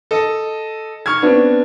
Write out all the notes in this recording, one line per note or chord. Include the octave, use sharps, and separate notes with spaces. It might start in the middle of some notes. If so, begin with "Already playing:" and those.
A4 D#5
C#6 F6 G#6
B3 C4 D4